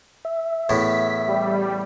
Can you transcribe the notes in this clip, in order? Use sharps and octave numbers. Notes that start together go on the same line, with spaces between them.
E5
E2 A2 B6
G3